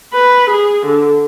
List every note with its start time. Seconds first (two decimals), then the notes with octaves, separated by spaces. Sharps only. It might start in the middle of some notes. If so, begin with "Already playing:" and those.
0.13 B4
0.50 G#4
0.87 D3